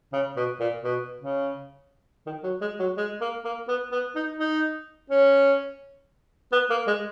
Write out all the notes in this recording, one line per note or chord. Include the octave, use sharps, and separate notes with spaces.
C#3
B2
A#2
B2
C#3
D#3
F#3
G#3
F#3
G#3
A#3
A#3
B3
B3
D#4
D#4
C#4
B3
A#3
G#3